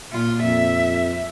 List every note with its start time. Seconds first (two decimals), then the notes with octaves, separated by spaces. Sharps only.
0.13 A#2 F4
0.43 F2 E5